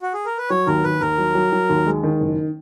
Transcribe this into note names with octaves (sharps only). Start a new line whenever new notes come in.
F#4
G#4
A#4
B4
F#3 C#5
D#2 A#4
D#2 B4
D#2 A#4
F#3
F#3
F#3
D#2
G#3
D#3
F#1